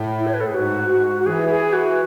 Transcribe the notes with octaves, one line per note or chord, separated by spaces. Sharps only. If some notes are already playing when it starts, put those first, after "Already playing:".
Already playing: A2
E4
C#5
B4
A4
A2 G#4
G#2 F#4
F#4
F#4
E3 G#4
G#4
F#4